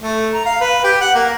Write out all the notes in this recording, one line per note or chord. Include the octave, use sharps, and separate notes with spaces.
A3
A#5
F5
B4
G4
F#5
A#3